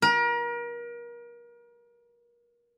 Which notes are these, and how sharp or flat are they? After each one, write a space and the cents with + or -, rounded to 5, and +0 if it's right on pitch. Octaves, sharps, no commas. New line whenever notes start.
A#4 +35